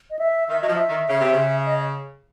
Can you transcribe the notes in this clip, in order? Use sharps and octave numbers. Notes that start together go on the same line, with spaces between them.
D#5
E5
D#3 E5
F#3 D#5
F3
E5
D#3
C#3
C3
C#3
D#5